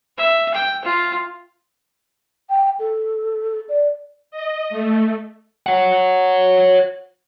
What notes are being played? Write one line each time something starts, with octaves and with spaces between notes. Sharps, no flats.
E5
G5
F4
G5
A4
D5
D#5
A3
C#5 F#5